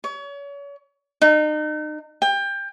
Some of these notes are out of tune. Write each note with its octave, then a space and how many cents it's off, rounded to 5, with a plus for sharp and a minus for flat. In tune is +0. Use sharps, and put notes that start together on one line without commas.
C#5 +35
D#4 -35
G5 +25